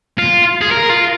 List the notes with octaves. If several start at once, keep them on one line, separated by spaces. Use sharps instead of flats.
F4
G#4
A#4
F4